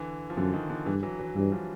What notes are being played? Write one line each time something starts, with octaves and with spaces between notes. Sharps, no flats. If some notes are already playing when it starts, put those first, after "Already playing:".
Already playing: D3 E3
F3
F#2 D3 E3
D#3
D3
G2 D3 E3
E3 F#3
E3 F#3
G2 E3 F#3
F3 G3